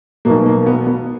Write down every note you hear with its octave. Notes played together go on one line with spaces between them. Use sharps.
B1 B2 A#3
A#3
B3
B3